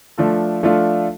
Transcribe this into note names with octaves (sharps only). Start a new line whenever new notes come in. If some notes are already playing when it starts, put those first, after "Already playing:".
F3 A3 D4 F4 A4
F3 A3 D4 F4 A4